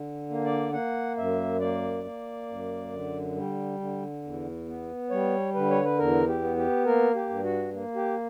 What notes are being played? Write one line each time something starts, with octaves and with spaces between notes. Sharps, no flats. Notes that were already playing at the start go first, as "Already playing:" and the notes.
Already playing: D3
A#3
D5
A#3 F#5
F#2 E5
A#3 D5
A#3
F#2
D3
G3
D3
E2
B3
G3 C#5
D3 B4
C#5
B4
E2 A#4
G4
B3
G4
A#3 A#4
G4
G2
F#4
A#3
G4